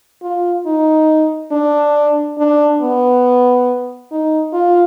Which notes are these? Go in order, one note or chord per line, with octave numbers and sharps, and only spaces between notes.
F4
D#4
D4
D4
B3
D#4
F4